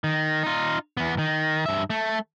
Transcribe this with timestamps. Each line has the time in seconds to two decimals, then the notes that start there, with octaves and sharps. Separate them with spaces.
0.04 D#3
0.43 D#4 F4
0.97 E2 B3
1.19 D#3
1.66 G2 E5
1.90 A3